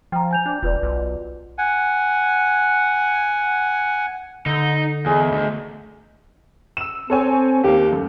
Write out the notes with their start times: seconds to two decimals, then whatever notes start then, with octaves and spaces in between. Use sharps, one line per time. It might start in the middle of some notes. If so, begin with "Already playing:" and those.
0.12 F3 G5 A#5
0.31 G#5 G6 F7
0.46 D4
0.63 E1 F4 B4 D5
0.82 B1
1.58 F#5 G#5
4.46 D3 D#4
5.06 E2 G#4 D#5
5.32 D2
6.77 E6 E7
7.10 C4 A4 C#5 G#5
7.64 D#2 A#3 G4
7.90 F#2 A3